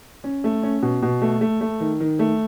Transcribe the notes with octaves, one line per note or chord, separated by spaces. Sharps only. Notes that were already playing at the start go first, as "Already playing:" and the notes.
C#4
A3
C#4
B2
B2
A3
A3
A3
D#3
D#3
A3